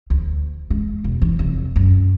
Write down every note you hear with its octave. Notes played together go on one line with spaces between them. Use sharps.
D2
G#3
E1
E3
F1
F#2